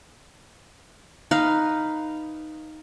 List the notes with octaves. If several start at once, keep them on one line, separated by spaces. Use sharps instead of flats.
D#4 B4 F5